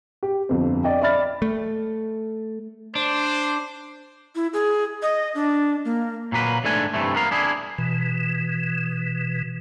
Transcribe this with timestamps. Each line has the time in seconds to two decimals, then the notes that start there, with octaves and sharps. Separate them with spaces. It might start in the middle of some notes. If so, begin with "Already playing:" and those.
0.23 G4
0.49 G1 F2 C4
0.84 D5 D#5 G5
1.02 D5 E5 B5 F6 A6
1.42 A3
2.95 D4 C5
4.35 E4
4.53 G#4
5.02 D#5
5.35 D4
5.85 A#3
6.32 A#2 F#3 A#3 B4
6.64 G#2 A3 D4 G#5
6.94 G2 C3 E3 A3
7.15 B3 A#4 F5
7.31 D4 E4 G#4
7.78 B2 E3